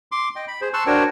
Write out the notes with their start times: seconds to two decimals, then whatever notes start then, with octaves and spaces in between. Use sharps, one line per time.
0.12 C6 D6
0.36 D#5 G5
0.48 B5
0.61 G#4 C5
0.73 A5 C6 C#6 E6 F#6
0.87 D4 F#4 A#4 C5 C#5 G5